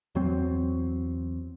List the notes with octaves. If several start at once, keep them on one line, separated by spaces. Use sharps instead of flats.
E2 F#3 C4